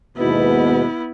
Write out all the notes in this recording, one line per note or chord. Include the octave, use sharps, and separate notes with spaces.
D#2 G#2 B2 B3 E4